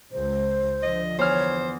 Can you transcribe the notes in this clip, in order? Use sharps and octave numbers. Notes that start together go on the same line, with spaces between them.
C#2 C5
D3 F3 D#5
E2 C5 C#5 F6